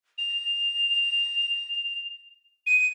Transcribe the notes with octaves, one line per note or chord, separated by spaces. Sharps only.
F7
D#7